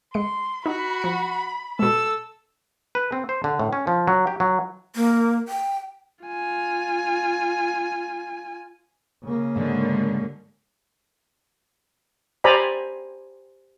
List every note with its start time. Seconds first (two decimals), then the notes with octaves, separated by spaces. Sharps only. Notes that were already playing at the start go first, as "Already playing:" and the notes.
0.14 G#3 C6 C#7
0.66 D#4 F#4 B5
1.02 F3 C#7
1.79 B2 G#3 A4 E6
2.95 B4
3.12 C4
3.29 C5
3.44 D3
3.60 A2
3.73 C#4
3.87 F3
4.07 F#3
4.27 G4
4.40 F#3
4.96 A#3
5.48 G5
6.25 F4 G#5
9.24 C#3 A#3
9.56 G#2 D3 G3 G#3
12.44 G4 C5 D5 G#5 A#5 B5